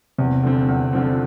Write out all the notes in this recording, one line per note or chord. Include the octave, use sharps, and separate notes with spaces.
E2 C3
D3 F3 C4
E2
D3 F3 C4